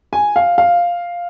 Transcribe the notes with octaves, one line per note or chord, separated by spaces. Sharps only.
G#5
F5
F5